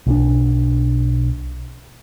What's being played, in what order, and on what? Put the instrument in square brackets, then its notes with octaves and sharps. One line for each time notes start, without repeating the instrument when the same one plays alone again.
[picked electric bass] B1 F#3 D4